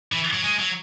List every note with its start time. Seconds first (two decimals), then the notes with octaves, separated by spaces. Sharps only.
0.12 E3
0.33 F#3
0.44 G#3
0.59 F#3